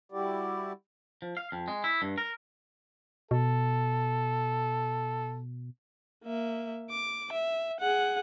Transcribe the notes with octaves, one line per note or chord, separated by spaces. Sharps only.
G3 E4 F#4 G4 D5
F3
F5
F2
G#3
E4
G2
A#4
B2 A4
A#3 E5
D6
E5
G#4 F#5